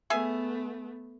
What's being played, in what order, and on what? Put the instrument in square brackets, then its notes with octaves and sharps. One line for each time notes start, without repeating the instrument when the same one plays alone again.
[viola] A3 B3 [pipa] G#4 E5 G#5